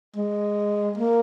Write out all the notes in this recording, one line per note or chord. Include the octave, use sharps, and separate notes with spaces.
G#3
A#3